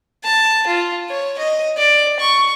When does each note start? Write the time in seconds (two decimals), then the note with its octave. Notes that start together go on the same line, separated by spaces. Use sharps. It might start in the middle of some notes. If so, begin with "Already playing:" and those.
0.24 A5
0.67 F4
1.09 C#5
1.39 D#5
1.78 D5
2.20 C#6